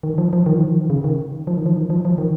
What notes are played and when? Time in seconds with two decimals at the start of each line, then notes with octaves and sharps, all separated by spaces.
0.03 D#3
0.18 F3
0.33 F3
0.46 D#3
0.55 F3
0.62 D#3
0.71 F3
0.79 D#3
0.90 C#3
1.04 D#3
1.47 F3
1.56 D#3
1.66 F3
1.76 D#3
1.90 F3
2.05 F3
2.18 D#3